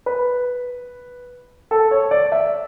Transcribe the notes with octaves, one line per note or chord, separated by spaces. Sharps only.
B4
A4
C#5
D5
E5